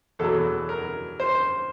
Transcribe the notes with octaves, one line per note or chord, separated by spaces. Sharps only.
E2 B2 F#3 A4
A#4
C5